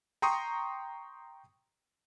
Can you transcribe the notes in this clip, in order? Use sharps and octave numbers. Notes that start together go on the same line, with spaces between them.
G5 A#5 C6 C#6 D#6